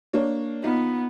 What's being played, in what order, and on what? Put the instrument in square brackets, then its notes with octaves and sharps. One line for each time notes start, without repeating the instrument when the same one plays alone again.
[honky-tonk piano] A#3 D4 C#5
[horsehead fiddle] B3 [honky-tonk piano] D#4 F4